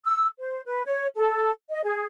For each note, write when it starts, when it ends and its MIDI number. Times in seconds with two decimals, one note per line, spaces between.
0.05 0.26 88
0.39 0.61 72
0.66 0.82 71
0.86 1.07 73
1.16 1.50 69
1.69 1.82 75
1.83 2.04 68